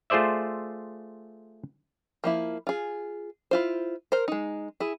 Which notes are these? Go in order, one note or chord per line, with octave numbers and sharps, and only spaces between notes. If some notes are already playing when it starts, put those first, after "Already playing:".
A3 F4 G#4 C5 D5 E5
F3 A#3 E4
F4 G#4
E4 F4 C5
A#4 C5
G#3 D#4
E4 G#4